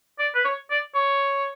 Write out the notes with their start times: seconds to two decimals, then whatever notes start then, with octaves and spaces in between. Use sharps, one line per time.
0.19 D5
0.35 B4
0.45 C#5
0.70 D5
0.95 C#5